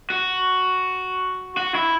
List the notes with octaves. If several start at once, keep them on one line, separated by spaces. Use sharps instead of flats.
F#4
F#4
E4